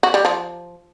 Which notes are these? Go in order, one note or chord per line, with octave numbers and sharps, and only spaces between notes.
F#4
G3
F3